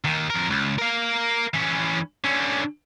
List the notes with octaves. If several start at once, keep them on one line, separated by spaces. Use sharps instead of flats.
D#2 D#3
F2 A#4
C#2
A#4 F5
E3 C#4
D3 C#4